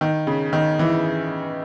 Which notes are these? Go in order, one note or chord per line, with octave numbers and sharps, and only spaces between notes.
D#3
C#3
D#3
E3